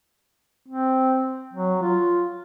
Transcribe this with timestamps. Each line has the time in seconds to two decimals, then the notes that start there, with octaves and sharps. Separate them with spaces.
0.68 C4
1.53 F#3
1.82 F4